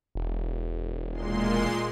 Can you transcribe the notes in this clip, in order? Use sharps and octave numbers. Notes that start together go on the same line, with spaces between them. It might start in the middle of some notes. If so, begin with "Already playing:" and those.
E1
A#2 G#3 C6